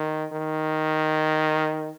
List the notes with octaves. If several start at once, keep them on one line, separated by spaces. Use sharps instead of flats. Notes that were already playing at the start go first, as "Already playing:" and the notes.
Already playing: D#3
D#3